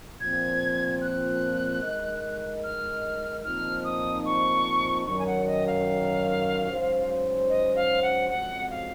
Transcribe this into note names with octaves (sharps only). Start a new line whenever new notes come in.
A#2 F3 C4 G#6
F#6
G#3 D#4 A#4 D#5
F6
A#2 F3 C4 D#4 F6
D#6
C#6
F#2 D#3 F#3 C#6
G#5
F#5
D#5
F5
G#2 F#3 C#4 F#4 C5
D#5
F5
F#5
F2 C#3 G#3 C4 F#4 F#5
F5